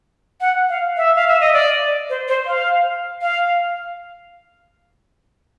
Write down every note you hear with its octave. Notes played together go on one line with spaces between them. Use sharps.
F#5
F5
E5
F5
E5
D#5
D5
C5
C5
F5
F5